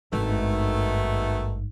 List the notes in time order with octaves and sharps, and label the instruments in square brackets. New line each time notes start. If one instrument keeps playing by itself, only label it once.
[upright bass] G#1 G2 [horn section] B2 D#3 A3